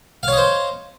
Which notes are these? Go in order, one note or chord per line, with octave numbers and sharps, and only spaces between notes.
C5 C#5 D#5 F5